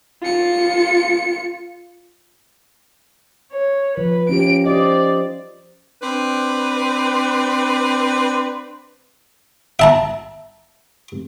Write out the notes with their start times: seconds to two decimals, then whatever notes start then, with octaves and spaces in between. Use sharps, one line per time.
0.22 F4 C#7
3.53 C#5
3.98 F3 B4
4.29 C#4 F4 G4 D7
4.66 G4 C5 D5 D#5
6.02 C4 D4 B4
9.79 E5 A5 A#5